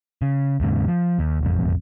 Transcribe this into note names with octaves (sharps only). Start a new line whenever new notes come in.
C#3
D#2 G#2 C#3
F3
D#2
E1 A1 F2